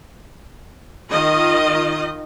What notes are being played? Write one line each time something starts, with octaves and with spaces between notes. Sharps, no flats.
D#3 F4 D#5